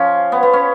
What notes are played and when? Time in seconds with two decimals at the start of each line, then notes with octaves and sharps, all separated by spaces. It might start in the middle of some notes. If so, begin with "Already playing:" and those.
Already playing: F3 C#4
0.32 B3
0.43 B3
0.53 C#4